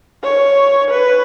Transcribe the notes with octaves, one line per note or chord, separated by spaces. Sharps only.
C#5
B4